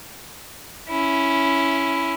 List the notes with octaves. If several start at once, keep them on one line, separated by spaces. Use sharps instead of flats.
C#4 E4